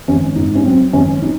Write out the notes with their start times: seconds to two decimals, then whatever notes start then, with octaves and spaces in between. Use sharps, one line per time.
0.08 G#1 C#4
0.36 G#2 D#4
0.55 C#4
0.65 F#3 C4
0.93 G#1 C#4
1.22 D#4